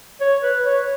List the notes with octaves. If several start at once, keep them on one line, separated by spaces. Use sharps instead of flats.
C#5
B4
C#5